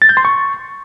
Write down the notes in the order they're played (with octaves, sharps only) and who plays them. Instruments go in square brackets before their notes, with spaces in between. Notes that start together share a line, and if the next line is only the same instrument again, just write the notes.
[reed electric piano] A6
G6
C6
C#6